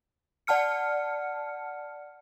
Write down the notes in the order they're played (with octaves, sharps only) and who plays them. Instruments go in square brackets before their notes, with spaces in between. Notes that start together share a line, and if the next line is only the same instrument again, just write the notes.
[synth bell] D5 F#5 A5 F6 C#7